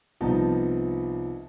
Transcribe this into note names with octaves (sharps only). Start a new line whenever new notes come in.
C2 F3 B3 D#4 A5 A#5